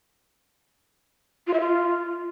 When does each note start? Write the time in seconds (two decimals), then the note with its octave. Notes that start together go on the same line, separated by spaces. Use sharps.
1.47 F4
1.54 E5
1.60 F4